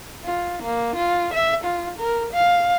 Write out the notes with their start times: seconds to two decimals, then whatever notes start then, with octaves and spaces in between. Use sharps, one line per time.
0.24 F4
0.63 A#3
0.96 F4
1.34 E5
1.65 F4
1.99 A#4
2.33 F5